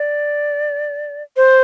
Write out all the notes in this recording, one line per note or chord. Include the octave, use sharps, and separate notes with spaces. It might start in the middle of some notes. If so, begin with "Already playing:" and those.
Already playing: D5
C5